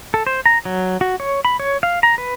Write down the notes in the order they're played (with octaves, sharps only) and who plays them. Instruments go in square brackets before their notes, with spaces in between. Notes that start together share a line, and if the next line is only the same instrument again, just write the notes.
[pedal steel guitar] A4
C5
A#5
F#3
F#4
C#5
B5
C#5
F5
A#5
B4